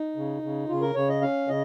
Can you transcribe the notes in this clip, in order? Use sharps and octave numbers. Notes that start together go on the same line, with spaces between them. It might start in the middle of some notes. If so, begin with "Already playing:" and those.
Already playing: D#4
C#3
C#3
C#3 F4
A#4
C#3 C#5
D#5
C#4 F5
C#3 D#5